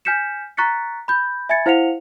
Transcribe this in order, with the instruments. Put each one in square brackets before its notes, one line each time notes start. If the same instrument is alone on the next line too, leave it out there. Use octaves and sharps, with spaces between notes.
[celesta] G#5 F6 G6 B6 C#7 E7
A#5 C#6 F#6 A6 B6 C#7
B5 G6
E5 G#5 B5 G#6 A6 C#7
E4 C5 F5 F#5 C#7 F7